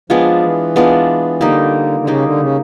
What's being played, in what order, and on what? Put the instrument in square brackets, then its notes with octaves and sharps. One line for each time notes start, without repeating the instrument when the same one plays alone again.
[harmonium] F3 [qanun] G#3 B3 D4 F4
[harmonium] E3
[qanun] G#3 B3 D4 F4
[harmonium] D3 [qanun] G3 A#3 D#4
[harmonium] D3
[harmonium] C#3 [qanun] G3 A#3 D#4
[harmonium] D3
C#3